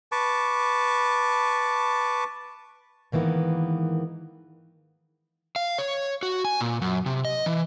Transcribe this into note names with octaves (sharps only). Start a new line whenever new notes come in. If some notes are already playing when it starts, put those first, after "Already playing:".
B4 A5 C#6 D6
G#2 D#3 E3 A#3 B3
F5
C#5
F#4
G#5
A#2
F#2
C3
D#5
E3